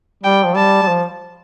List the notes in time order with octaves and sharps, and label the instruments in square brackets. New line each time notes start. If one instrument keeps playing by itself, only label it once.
[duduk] G3 [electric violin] G5
[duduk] F3
[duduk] G3 [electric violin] A5
[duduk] G3
F3